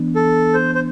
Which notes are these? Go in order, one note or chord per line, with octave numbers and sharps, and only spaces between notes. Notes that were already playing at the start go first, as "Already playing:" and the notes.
Already playing: E3 B3 D4
A4
C5
C5